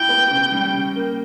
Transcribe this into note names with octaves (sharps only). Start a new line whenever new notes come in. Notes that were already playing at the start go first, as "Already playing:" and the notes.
Already playing: E4 G5
B3
C#3
G3
C#3
A#3